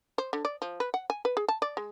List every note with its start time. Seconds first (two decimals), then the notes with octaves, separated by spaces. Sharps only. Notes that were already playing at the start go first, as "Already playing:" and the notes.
0.18 C5
0.33 D3
0.45 D5
0.62 F3
0.80 B4
0.94 F#5
1.10 G#5
1.25 B4
1.37 G#4
1.48 A5
1.62 D5
1.77 G#3